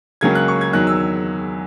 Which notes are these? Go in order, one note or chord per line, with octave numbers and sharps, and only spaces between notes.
C#2 C#3 F#3 A#3 C#4 G#6
F#6
C#6
G#6
E2 D#3 F#3 F#6
E6